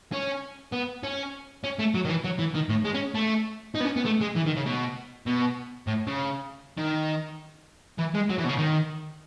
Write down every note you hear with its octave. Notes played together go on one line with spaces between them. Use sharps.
C#4
B3
C#4
C#4
A3
F#3
D#3
E3
F#3
E3
D#3
A2
G#3
C#4
A3
D#4
B3
C#4
B3
A3
G#3
E3
D#3
C#3
B2
B2
A2
C#3
D#3
E3
G#3
F#3
E3
B2
C#3
D#3